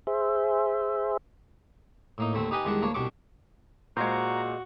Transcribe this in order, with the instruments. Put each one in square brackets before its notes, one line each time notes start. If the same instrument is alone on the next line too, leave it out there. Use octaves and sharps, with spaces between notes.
[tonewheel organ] G#4 C5 E5
[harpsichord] A2 A#3 D#4
D#2 D3 A3 C4
D#4 G4 B4 D#5 G#5
E2 D#3 G3 G#3 D4 F#5
D2 A#3 D4 C#5
C2 B2 G3 D4 C#6 D6
[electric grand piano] A#2 [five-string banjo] G#3 C5 [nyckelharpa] F#4 [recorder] A#5